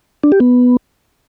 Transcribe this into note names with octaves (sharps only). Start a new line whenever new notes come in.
D4
G4
B3